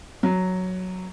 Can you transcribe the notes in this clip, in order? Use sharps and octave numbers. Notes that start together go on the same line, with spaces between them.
F#3